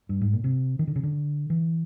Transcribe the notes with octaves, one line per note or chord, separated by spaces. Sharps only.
G2
G#2
A#2
C3
D#3
D3
C#3
D3
E3